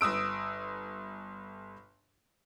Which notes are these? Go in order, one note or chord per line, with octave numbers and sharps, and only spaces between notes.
G1 D#6 E6 D7